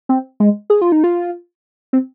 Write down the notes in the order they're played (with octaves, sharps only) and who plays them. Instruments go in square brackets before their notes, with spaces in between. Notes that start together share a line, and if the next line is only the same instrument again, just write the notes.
[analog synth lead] C4
G#3
G#4
F4
D#4
F4
C4